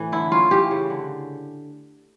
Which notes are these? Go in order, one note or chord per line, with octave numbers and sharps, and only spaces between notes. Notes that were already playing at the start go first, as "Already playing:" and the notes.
Already playing: A2 E3
D3 E4
C#4 F4
E3 G4
C#3
D3